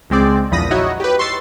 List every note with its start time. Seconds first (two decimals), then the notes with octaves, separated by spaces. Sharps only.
0.10 C#2 G#3 C4 D5
0.51 A#1 E2 F3 B5 D#6 A#6
0.71 D#4 E4 F#4 C#5 D#5
1.00 G4 B4
1.19 C6 C#6 E6 A6 C7